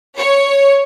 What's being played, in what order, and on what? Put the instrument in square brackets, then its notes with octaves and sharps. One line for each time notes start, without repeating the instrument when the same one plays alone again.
[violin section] C#5